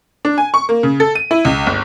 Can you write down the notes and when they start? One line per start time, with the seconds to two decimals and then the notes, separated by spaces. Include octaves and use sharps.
0.25 D4
0.38 G#5
0.54 C#6
0.69 A#3
0.83 C#3
1.00 A4
1.15 D#7
1.31 E4
1.45 C#2
1.67 G1